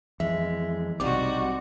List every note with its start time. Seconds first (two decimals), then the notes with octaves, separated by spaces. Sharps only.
0.20 F2 E3 G#3 E5
1.00 B1 C3 G3 C4 D#4 F#4 D6